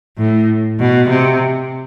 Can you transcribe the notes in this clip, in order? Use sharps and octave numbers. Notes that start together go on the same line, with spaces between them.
A2
B2
C3